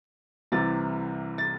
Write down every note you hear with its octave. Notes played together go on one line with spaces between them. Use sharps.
C2 C3 E3 A6
A6